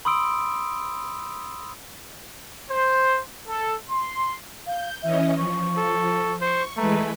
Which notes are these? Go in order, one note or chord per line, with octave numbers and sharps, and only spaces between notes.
B5 C6 D#6 E6 D7
C5
A4
C6
F5 G6
E3 C#4 D#5 E5
F3 C#6
A4
C5 C#6
E3 G#3 A3 B4 A#5